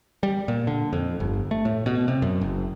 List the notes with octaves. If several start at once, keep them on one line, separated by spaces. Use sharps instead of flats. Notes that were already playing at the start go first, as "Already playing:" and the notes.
G3
A#2
D3
F2
G1
A3
A2
B2
C3
F#2
F#1